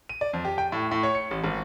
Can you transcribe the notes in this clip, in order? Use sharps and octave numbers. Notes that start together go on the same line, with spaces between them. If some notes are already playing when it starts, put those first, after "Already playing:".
D#7
D5
F2
G4
G5
A2
A2
C#5
C#7
A1
G#1